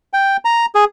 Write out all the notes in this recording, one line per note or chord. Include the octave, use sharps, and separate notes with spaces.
G5
A#5
G#4